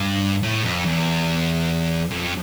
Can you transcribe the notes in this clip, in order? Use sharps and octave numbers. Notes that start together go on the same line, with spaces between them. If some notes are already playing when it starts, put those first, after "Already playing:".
Already playing: G2
A2
F2
E2
F2